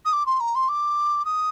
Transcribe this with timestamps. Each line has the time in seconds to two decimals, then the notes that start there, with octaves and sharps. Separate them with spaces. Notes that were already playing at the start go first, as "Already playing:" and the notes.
0.05 D#6
0.12 D6
0.26 C6
0.40 A#5
0.55 C6
0.68 D6
1.25 D#6